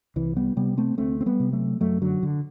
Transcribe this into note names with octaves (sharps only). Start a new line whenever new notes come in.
C2 E3
G3 B3
C3 G3 B3
A3 C4
D2 A3 C4
C4
G3 B3
C3
F#3 A3
F#2 F#3 A3
D3 F#3
D3